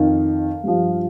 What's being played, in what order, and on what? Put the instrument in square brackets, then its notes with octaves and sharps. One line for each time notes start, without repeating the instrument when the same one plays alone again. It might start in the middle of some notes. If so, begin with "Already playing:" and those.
Already playing: [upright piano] F2 D#3 F5
G2 F3